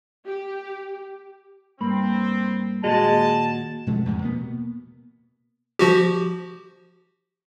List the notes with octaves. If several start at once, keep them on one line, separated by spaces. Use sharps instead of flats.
G4
G2 A#3 C4 B5
D#2 A#2 G#3 F#4 A5
B2 F3 G#3 A3
E2 G#2 C3
B2 A#3 B3
F3 F#4 G4